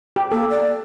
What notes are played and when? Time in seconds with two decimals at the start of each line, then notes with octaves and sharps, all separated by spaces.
0.16 G4
0.32 A#3 A4
0.50 D5